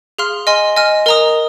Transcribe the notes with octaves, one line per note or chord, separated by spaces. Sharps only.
G#4 F5 C6 F6
D#5 G#5 C6 F6
D#5 G#5 F6
A#4 D#5 A#5 D#6